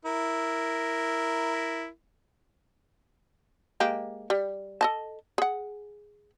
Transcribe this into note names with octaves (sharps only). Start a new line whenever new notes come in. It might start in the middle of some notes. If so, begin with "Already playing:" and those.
E4 A#4
G#3 A#3 G4
G3
A4 D#5 A5
G#4 F#5